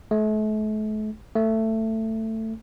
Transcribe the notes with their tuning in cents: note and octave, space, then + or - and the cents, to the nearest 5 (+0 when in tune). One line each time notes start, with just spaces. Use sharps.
A3 -40
A3 +15